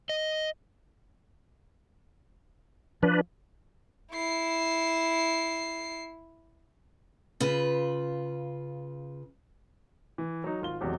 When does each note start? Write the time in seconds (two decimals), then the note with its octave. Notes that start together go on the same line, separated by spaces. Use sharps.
0.09 D#5
3.03 F3 D4 B4
4.12 E4 C7
7.40 C#3 F4 B4
10.18 E3
10.44 F#3 D#4
10.62 G#1 F4 G7
10.81 E1 E2 C3 F#3 G4